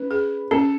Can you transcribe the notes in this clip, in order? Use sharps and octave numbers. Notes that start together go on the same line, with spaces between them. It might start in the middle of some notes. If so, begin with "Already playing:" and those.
Already playing: C#4 B4
G#4
C#4 A4